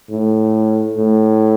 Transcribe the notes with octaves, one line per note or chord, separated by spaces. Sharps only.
A2
A2